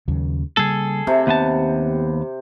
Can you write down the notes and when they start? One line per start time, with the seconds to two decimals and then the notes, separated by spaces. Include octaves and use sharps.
0.08 D#2 C#3 F#3
0.57 C#3 G3 A#3 G#4 A4
1.07 C3 C4
1.27 D#2 B3 A5